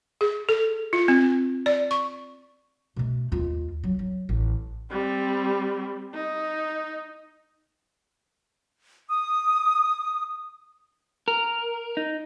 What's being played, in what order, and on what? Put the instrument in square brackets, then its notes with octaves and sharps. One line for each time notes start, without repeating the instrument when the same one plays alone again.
[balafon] G#4
A4
F4
C4
D5
C#6
[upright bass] B2 A3
D#2 F4
F#3
F#3
A1
[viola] G3 C4
D#4
[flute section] D#6
[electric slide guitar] A#4
D#4